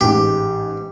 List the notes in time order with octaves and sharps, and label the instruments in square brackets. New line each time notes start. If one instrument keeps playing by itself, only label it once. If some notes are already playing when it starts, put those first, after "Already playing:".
[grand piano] A1 G#2 [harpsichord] G4